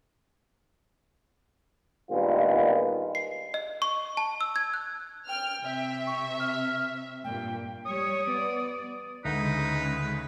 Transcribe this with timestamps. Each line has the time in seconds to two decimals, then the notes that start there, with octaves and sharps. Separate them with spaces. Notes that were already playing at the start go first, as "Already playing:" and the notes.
2.11 G2 A#2 D#3 G#3 B3 F4
3.15 C7
3.54 D#5
3.82 C#6
4.17 A5
4.41 E6
4.56 G#6
4.74 F#6
5.28 G5 F6
5.63 C3 E5
6.07 C#6
6.39 F6
7.24 G2 A#2 G5
7.86 G3 C#5 D#6
8.27 B3 D5
9.25 D2 C#3 G#3 D#4 B4